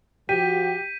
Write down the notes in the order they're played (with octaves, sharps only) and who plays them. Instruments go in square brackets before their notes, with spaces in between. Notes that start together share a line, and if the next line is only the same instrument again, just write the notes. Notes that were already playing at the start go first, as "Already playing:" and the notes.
[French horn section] F3 F#4 [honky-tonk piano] G4 [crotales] G6 B6 D#7